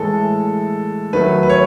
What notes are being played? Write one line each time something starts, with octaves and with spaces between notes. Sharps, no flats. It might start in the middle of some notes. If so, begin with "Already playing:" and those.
Already playing: A2 E3 G#3 A4
D#3 F#3 A3 B4
B4
C#5